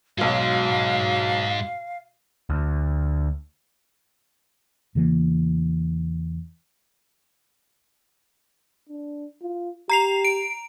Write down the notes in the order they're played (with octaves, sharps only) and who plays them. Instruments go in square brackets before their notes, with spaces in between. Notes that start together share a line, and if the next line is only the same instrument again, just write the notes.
[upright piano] B1 F#3 [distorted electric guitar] G#2 G#3 [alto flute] F5
[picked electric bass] D2
[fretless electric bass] E2 C#3 E3 A#3
[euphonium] D4
F4
[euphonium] G4 [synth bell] A#5 C7 F7
[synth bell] D7